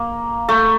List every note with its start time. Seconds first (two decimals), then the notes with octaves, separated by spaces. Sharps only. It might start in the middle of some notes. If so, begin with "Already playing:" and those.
Already playing: A#3
0.49 A3